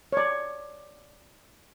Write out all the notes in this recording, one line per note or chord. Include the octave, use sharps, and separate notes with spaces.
C#5 D5